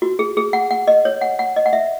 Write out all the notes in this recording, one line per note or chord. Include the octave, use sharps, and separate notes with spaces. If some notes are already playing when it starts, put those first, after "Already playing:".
F#4
G#4
G#4
F#5
F#5
D#5
C#5
F#5
F#5
D#5
F#5
E5